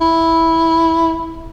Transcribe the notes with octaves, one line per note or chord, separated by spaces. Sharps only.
E4